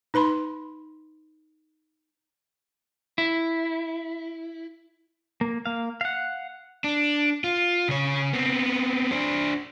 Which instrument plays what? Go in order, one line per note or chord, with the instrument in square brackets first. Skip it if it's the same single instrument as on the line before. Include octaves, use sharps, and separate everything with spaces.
[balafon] D#4 B4 B5 C6
[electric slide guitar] E4
[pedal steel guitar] A#3
A#3 F5
F5 F#5
[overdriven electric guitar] D4
F4
C#3 C#5
B3 C4
D4 C5